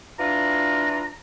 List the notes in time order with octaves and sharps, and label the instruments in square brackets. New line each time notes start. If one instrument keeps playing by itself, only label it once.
[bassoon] E3 [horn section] D4 F4 [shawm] A#5